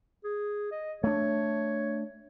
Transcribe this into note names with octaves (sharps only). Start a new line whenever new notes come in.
G#4
D#5
A3 D4 C#5